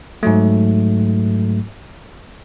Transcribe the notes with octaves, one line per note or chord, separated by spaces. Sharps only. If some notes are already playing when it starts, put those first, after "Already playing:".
G#2 F#3 A3